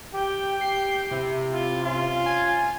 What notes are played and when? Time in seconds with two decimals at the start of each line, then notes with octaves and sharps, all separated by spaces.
0.13 G4 G5
0.61 G4 C7
1.11 C3 E4
1.52 F4
1.84 C#4 F4
2.26 G#5